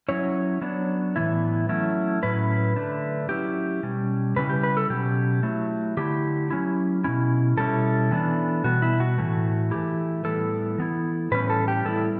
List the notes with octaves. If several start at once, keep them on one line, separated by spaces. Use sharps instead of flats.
F#3 C#4 E4 C#5
F#3 B3 D4
A2 E3 B3 E4
F#3 A3 C#4 E4
A2 F#3 C#4 E4 B4
D3 A3 D4
F#3 C#4 E4 G4
B2 G3 C#4
C#3 G3 C#4 E4 B4
G4
B4
A4
B2 F#3 C#4 G4
F#3 A3 E4
D3 A3 C#4 E4 G4
F#3 C#4 E4
B2 G3 C#4 E4
B2 G3 C#4 E4 A4
E3 B3 D4
B2 G3 B3 F#4
E4
F#4
A2 E3 A3
E3 A3 E4 G4
A2 G3 B3 E4 A4
E3 B3 E4
A2 E3 G3 C#4 B4
A4
G4
A2 G3 B3 E4 A4